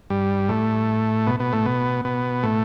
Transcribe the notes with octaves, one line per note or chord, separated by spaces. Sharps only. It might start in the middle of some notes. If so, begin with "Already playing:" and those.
G2 G3
A2 A3
B2 B3
B2 B3
A2 A3
B2 B3
B2 B3
A2 A3